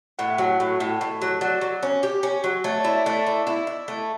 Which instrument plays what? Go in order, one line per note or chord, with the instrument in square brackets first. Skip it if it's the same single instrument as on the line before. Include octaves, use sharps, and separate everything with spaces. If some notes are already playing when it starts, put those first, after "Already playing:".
[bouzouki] A2 [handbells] F#5
[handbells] E5
[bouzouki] F#3 [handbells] F#5
[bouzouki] A2
A2
A2
F#3
[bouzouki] F#3 [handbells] D5
[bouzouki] F#3
C#4
G4
C#4
F#3
[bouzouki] A3 [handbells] C#5
[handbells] D5
[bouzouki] E4
[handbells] E5
[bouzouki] A3 [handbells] D5
[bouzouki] E4 [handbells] D5
[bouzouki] E4
E4
A3